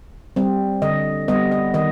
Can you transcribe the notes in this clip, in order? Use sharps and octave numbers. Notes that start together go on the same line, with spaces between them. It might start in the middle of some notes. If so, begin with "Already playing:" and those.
G3 C4
D3 D#5
G3 B3 D#5
D#5
D#3 D#5